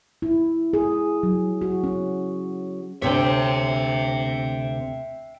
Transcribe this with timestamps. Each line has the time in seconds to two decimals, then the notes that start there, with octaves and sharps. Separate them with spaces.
0.22 E4
0.73 G#4
1.23 F#3
1.62 F#4
1.84 C#4
3.02 D2 C3 C#5 E5 G5